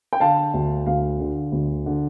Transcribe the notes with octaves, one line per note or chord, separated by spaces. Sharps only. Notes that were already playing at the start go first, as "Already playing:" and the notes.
G5
D3 F5 A5
D2
D2 F5
D3
D2
D3